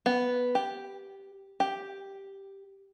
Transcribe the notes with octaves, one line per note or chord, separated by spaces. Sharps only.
B3
G4
G4